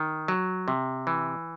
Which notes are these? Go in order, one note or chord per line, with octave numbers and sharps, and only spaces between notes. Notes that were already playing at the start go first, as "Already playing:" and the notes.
Already playing: D#3
F#3
C3
E3